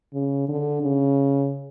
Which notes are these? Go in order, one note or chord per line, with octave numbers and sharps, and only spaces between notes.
C#3
D3
C#3